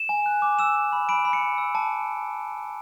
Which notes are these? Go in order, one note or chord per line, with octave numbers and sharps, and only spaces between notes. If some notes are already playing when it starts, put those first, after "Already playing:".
Already playing: E7
G#5
F#6
D6
E6 E7
E6
B5
B5 D7
B5
C#7
B5
E6
A5